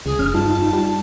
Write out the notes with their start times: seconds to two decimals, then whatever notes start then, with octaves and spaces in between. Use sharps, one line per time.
0.06 C#2 G#4
0.19 F1 C#4 F6
0.34 G2 D#4 F4 A5
0.73 G3